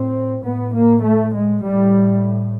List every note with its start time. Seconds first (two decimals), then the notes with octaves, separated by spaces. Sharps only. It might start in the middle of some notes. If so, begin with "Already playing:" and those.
Already playing: A2 C4
0.44 A2 B3
0.73 A#3
1.03 A3
1.33 G#3
1.62 A2 G3